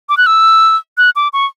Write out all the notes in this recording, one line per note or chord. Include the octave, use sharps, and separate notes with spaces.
D6
F#6
E6
F#6
D6
C#6